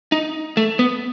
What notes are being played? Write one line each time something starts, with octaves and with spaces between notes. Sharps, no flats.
D#4
A3
B3